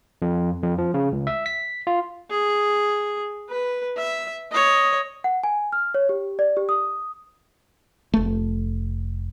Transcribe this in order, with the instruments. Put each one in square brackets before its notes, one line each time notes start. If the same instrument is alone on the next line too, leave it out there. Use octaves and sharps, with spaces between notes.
[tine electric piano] F2
F2
F3
C#3
C#2
E5
B6
F4
[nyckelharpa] G#4
B4
E5
C#5 D#5
[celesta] F#5
G#5
F6
C#5
G4
D5
G4
D#6
[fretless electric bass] F1 A3